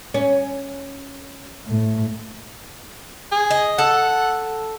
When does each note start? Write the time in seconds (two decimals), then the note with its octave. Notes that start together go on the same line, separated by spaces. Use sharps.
0.14 C#4
1.67 A2 A3
3.32 G#4
3.51 D#5
3.79 A4 F#5